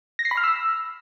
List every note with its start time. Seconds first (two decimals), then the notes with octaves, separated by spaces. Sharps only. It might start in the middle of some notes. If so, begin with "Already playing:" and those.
0.19 A#6
0.25 C7
0.31 B5
0.37 F6
0.44 E6